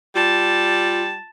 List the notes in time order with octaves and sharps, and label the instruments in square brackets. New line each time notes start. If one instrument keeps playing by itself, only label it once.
[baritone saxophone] G3 [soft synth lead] F4 [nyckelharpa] A5